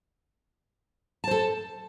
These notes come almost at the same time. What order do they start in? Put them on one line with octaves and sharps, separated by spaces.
A5 C5 A4